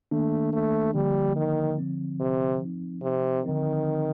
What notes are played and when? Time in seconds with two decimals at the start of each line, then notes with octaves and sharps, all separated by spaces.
0.11 D#3 A3 A#3 D4
0.53 A3
0.94 D3 F3 G3 A#3
1.36 D#3
1.78 D3 F3 C4
2.20 C3
2.61 F3 C4 D#4
3.02 C3
3.44 D3 D#3 F3 C4 D#4